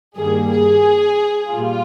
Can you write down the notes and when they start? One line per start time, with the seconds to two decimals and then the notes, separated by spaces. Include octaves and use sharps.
0.17 G2 D#3 G3 A#3 G#4
0.50 G#4
1.51 A#2 G3 F4